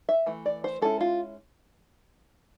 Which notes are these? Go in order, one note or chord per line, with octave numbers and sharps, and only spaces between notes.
E5
E3 A3
D5
C5
G#3 C#4 E4 A4
F4